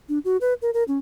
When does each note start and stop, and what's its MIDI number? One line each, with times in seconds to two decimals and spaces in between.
0.09 0.19 62
0.25 0.37 66
0.41 0.54 71
0.62 0.70 70
0.74 0.84 70
0.88 0.98 61